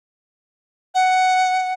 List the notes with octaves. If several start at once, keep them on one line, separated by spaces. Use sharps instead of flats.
F#5